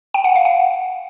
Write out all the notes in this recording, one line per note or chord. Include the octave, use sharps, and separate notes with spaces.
G5
F#5
F5
F#5